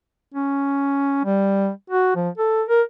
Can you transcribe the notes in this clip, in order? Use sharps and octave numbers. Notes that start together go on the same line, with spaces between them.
C#4
G3
F#4
F3
A4
A#4